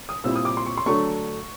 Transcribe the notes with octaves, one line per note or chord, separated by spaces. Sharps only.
D#6
A#2 G3 C4 E4 E6
D#6
D6
C6
C#6
C6
D3 F#3 A3 D4 C#6